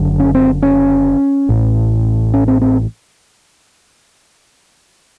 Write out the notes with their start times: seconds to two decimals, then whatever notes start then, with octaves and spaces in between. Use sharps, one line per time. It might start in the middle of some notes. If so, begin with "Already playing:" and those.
Already playing: F#1 F#2 D3
0.20 C#4
0.35 C4
0.62 C#4
1.49 A1 A2
2.34 C#4
2.48 C4
2.62 C4